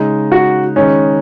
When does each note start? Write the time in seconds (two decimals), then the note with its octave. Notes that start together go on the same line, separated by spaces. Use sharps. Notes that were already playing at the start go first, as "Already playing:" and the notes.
Already playing: C#3 G#3 D#4
0.32 F#4
0.76 D#3 G#3 C#4 D#4